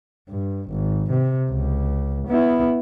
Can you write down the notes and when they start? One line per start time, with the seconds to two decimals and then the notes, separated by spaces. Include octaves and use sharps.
0.30 G2
0.70 G#1
1.11 C3
1.50 C#2
2.28 B3 E4